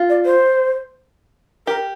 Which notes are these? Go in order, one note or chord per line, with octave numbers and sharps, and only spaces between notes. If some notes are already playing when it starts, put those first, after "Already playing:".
Already playing: F4
D5
C5
G4 A#4